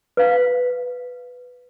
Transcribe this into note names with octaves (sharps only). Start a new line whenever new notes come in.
B4 F5